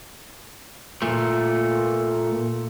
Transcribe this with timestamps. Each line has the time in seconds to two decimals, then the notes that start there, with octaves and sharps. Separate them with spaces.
1.02 A#2 A3